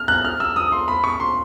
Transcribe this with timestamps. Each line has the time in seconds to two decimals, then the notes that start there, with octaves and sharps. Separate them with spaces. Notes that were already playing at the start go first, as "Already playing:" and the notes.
Already playing: F6
0.08 F#6
0.25 F6
0.40 E6
0.56 D#6
0.72 C6
0.88 B5
1.04 C#6
1.20 C6